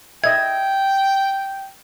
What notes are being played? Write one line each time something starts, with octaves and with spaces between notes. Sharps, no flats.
D#5 E5 G5 G#6